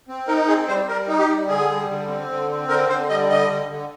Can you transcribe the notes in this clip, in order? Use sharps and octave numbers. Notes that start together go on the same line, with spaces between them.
C4
D#4 A#4
C4 G#4
G3 C5
G3 A#4
D#4
G4
G3
D3 G#4
G3
D3
C4
D3
C4
D3 A#4
D3 C5
G3 D#5
D3 D#5
D3
D3